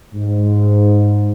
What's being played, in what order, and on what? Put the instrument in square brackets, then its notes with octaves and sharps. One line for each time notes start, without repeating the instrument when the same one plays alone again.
[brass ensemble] G#2